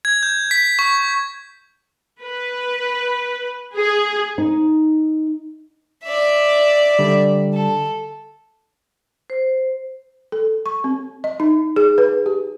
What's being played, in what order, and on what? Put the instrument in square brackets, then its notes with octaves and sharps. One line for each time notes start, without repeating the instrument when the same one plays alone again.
[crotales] G#6
G6
B6
C#6
[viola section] B4
G#4
[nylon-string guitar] D#4
[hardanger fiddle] D5 E5
[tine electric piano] D3 G3
[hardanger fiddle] A4
[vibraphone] C5
[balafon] A4
C#6
C4
D#5
D#4
G#4
B4
G4